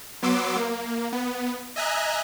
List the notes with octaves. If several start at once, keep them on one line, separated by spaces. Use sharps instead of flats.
F#3 B3 C6 D6 E6
A#3
B3
D#5 E5 G#5 A#5 F#6